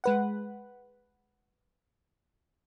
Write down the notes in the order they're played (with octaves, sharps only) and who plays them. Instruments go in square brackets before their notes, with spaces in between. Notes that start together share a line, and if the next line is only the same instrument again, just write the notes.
[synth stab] G#3 B4 F#5